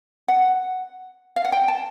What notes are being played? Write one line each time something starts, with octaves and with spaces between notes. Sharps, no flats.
F#5
F5
F#5
G5
A5